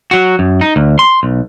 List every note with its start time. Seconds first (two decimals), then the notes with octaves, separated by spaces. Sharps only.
0.11 F#3 F#4
0.39 F#2
0.61 D#4
0.76 D2
0.99 C6
1.23 B1